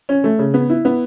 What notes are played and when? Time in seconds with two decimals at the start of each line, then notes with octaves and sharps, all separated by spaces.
0.09 C#4
0.24 A3
0.39 C#3
0.54 B3
0.70 E4
0.85 B3